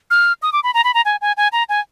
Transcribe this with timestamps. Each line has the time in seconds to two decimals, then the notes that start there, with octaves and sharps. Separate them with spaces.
0.10 F6
0.42 D#6
0.53 D6
0.63 B5
0.74 A#5
0.84 B5
0.94 A#5
1.05 G#5
1.21 G#5
1.37 G#5
1.52 A#5
1.69 G#5